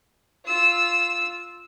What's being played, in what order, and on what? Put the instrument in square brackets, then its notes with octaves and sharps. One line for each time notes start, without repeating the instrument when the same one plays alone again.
[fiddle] F4 E6